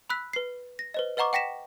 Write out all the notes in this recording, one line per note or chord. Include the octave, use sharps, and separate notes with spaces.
B5 E6 F#6 B6
B4 C7
A#6
B4 C5 D#5
B4 D#5 F#5 A#5 C#6 D6
F#5 G5 A#6 B6 E7